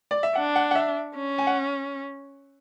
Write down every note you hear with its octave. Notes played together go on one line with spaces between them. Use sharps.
D5
E5
D4 F#5
F#5
F#5
E5
C#4
G#5
F#5